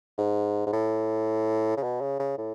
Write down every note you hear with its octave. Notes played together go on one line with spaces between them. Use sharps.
G#2
G#2
A2
C#3
B2
C#3
C#3
A2